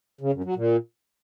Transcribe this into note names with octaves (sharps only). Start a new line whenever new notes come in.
C#3
F#2
F#3
A#2